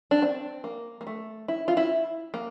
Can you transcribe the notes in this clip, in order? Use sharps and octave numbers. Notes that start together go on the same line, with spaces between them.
D4
C4
A#3
A#3
A3
E4
F4
E4
A#3